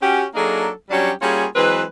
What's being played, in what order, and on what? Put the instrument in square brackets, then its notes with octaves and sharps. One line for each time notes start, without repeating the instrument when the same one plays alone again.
[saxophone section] C#4 F#4 G4
F#3 A#3 D4 D#4 G#4 A4
F#3 G3 C#4 D4 F#4 G4
G3 A#3 C#4 F4 F#4 G#4
E3 F#3 G#3 C4 B4